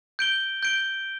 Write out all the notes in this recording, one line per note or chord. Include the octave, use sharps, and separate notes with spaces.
G6 D7 G7
G6 D7 G7